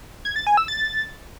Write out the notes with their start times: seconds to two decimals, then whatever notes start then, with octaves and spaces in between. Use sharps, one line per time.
0.25 G#6
0.36 A6
0.47 G#5
0.57 E6
0.68 A6